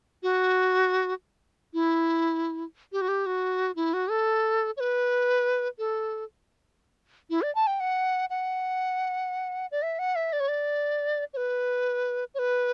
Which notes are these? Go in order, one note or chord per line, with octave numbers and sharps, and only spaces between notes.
F#4
E4
G4
F#4
G4
F#4
E4
F#4
A4
C#5
B4
A4
E4
D5
A5
G5
F#5
F#5
D5
E5
F#5
E5
D5
C#5
D5
C#5
B4
C#5
B4